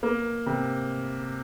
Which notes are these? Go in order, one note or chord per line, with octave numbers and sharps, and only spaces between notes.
A#3
C3